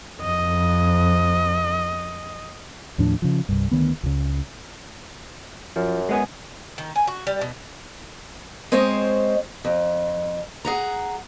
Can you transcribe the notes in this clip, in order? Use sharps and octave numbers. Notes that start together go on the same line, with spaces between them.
F2 D#5
D#2 A2 F3 D4
C#3 F3
C2 G2
D2 D#3 B3
C#2 C#3
F#2 F3
G#3 B3 G#4
D#3
G#5
F#4
G3
B2
G#3 C4 C5 C#5 D#5
F2
G#4 F#5 A#5